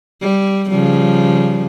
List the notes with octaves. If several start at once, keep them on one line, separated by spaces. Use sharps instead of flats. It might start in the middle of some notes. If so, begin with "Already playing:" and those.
G3
C#3 F3 G3